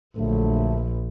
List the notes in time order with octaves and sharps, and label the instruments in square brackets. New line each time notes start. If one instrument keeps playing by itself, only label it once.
[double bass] A#1 [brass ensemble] D3 F#3 A3